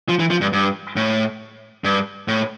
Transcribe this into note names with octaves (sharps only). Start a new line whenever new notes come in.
F3
E3
F3
G2
G2
A2
G2
A2